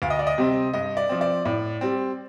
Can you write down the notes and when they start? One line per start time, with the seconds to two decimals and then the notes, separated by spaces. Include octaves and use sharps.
0.02 D2 F5
0.10 D#5
0.19 D5
0.27 D#5
0.38 C3 G3 C4
0.73 G2 D#5
0.97 D5
1.09 F3 C4
1.21 D5
1.45 A2 D5
1.81 G3 C4